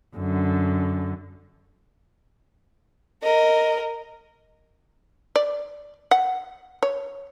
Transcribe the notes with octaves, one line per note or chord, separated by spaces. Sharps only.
F#2 D3
A#4 D#5
D5
F#5
C#5